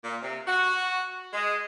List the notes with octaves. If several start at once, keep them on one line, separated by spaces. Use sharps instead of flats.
A#2
C3
F#4
G#3